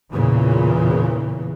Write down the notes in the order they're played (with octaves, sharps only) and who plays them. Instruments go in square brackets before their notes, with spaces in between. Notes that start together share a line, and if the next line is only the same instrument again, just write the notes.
[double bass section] E2 A#2 C#3 E3